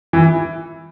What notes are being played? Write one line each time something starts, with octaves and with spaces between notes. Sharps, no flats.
E3